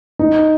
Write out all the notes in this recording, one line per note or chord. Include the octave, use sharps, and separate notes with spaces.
D#4